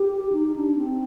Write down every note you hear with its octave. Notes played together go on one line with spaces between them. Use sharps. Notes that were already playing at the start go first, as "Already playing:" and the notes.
Already playing: G4
D#4
D4
C4